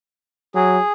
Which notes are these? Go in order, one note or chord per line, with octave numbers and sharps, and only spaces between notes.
F#3 G#4